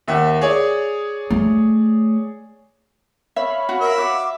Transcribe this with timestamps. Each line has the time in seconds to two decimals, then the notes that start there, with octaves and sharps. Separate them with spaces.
0.08 D#2 E5 F#5
0.41 G#4 C#5 D5
1.30 A3
3.36 C#5 E5 F5 B5
3.69 F#4
3.80 A#4 E5
3.98 F#4 D6